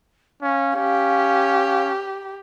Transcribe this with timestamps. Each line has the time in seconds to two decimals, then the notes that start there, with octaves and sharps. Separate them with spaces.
0.42 C#4 F5
0.76 C#4 G4